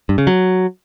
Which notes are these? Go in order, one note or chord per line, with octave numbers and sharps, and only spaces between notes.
G2
C#3
F#3